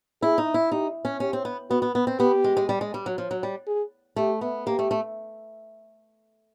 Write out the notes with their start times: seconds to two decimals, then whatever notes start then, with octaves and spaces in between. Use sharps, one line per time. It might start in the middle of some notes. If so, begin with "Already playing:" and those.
0.22 E4 G#4
0.38 D#4
0.54 E4
0.71 D#4 G4
1.05 C#4
1.20 C#4 G4
1.33 C4
1.45 B3
1.70 B3 F#4
1.82 B3
1.95 B3
2.07 C4
2.20 B3 G4
2.44 G#3
2.57 G#3
2.69 G3
2.81 G#3
2.94 G3
3.06 F#3
3.18 F3
3.31 F#3
3.43 G3
3.67 G#4
4.16 A3 G4
4.41 B3
4.67 A#3 G4
4.79 A3
4.91 A3